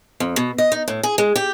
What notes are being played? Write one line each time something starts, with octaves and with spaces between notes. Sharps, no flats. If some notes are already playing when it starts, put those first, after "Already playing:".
F2
B2
D#5
D#4
A2
G#4
G#3
G4